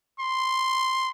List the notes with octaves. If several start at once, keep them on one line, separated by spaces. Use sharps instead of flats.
C6